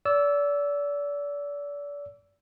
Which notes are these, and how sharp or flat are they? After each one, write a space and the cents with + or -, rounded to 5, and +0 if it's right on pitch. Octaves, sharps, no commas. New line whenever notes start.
D5 -35 E6 +0